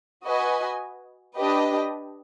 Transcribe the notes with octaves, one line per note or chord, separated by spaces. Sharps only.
F#4 B4 D#5 G#5
D4 G4 B4 D#5